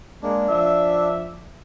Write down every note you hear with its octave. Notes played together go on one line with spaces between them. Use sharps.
G#3 A#3 D4
F3 E5